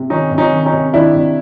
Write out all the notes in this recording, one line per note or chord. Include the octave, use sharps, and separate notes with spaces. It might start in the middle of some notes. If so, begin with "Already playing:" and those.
Already playing: C3
D#3 C#4 D#4
C3
C#4 D#4
D#3
C#4 D#4
C3
D#3 D4 E4
C3